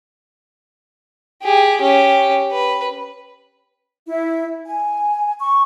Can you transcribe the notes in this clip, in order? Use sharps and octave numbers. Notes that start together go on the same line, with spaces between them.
G4 G#4
C#4 G4
B4
E4
G#5
C#6